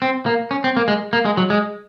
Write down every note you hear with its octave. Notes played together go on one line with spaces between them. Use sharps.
C4
A#3
C#4
C4
A#3
G#3
A#3
G#3
F#3
G#3